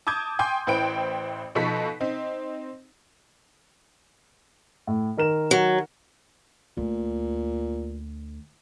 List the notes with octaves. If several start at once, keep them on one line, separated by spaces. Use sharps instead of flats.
A5 D6 D#6 G6 G#6
G5 G#5 C6 D6 G6
A1 E4 B4 C5 G5 D7
B2 F3 D#4 A4 C#6 B6
C4 D#4
A2
D#3 A#4 E7
F#3
D2 A#2